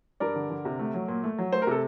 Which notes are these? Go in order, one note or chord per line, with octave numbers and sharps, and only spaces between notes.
G2 A#4 D5
D3
D3
C3
A3
F#3
A#2
A3
F#3
A3 C5
A#4
C3 A4